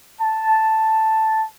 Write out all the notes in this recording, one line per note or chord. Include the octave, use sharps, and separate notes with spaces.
A5